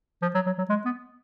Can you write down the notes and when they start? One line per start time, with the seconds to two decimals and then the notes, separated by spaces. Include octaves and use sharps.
0.22 F3
0.35 F#3
0.46 F#3
0.58 F#3
0.69 G#3
0.85 B3